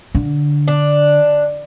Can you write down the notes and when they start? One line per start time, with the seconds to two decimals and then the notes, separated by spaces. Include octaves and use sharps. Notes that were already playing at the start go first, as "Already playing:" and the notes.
0.15 D3
0.68 D4